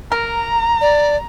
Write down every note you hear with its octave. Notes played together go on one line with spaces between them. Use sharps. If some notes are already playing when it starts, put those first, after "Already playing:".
A#4 A#5
D5